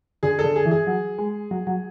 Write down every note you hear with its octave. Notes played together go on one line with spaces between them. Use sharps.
D3 G#4
A4
D3
G#4
E3
G#4
F#3
G#3
F#3
F#3